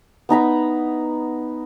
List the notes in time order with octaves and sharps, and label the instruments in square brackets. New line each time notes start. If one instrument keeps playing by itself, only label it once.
[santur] B3 D#4 A#5 B5